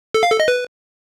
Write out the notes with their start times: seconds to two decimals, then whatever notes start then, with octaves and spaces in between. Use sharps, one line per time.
0.14 A4
0.23 F5
0.31 A4
0.40 D#5
0.48 B4